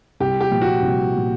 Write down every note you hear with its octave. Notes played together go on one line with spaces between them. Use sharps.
C2 G4
G4
A#2 F3
F#4
C2
A#2 F3